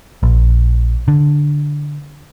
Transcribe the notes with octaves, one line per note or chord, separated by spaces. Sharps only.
A#1
D3